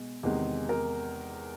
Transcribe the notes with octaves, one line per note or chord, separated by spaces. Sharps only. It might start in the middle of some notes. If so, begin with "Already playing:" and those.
Already playing: B2 G#3
E2 C3 D#3 G#3
A#4